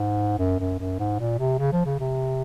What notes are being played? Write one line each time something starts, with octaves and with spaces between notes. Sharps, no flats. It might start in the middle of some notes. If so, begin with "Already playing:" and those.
Already playing: G#2
F#2
F#2
F#2
G#2
A#2
C3
C#3
F3
C#3
C3